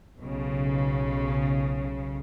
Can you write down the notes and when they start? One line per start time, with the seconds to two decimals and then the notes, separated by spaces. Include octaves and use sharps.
0.17 B1 C#3